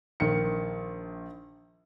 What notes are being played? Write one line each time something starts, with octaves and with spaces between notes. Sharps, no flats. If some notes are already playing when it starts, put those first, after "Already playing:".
A#1 D#3 C#7